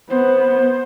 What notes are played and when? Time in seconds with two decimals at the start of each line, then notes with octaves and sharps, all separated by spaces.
0.10 B3 C5